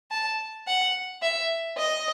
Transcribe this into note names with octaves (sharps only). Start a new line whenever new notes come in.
A5
F#5
E5
D#5